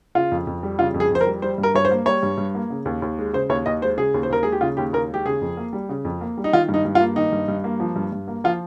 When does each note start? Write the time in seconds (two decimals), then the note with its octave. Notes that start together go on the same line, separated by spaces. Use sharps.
0.15 C#3 F4
0.32 F2
0.47 F2
0.63 G3
0.79 C#3 F4
0.94 F2
1.00 G#4
1.11 F2 C5
1.21 A#4
1.27 G3
1.42 G3 C5
1.58 G2
1.63 A#4
1.74 G2 C#5
1.85 C5
1.91 A#3
2.06 G3 C#5
2.23 G2
2.38 G2
2.55 A#3
2.70 C#3
2.85 D#2
3.02 D#2
3.19 G#3
3.33 C#3 C5
3.49 D#2 C#5
3.66 D#2 D#5
3.82 G#3 C5
3.97 C#3 G#4
4.14 D#2
4.23 C5
4.30 D#2 A#4
4.43 G#3 G#4
4.52 G4
4.61 C#3 F4
4.77 D#2 G4
4.93 D#2 A#4
5.10 G#3 G4
5.25 C#3 G#4
5.42 F2
5.57 A#3
5.73 G3
5.89 C#3
6.05 F2
6.21 A#3
6.37 G3
6.44 D#4
6.53 D#3 F4
6.69 G2
6.74 D#4
6.85 G2
6.95 F4
7.01 A#3
7.16 D#3 D#4
7.32 G2
7.48 G2
7.64 A#3
7.80 F3
7.96 G2
8.12 G2
8.28 A#3
8.44 F3 F4